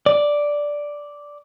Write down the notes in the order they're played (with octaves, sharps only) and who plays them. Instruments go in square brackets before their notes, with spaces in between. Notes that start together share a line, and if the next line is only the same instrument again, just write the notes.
[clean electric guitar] D5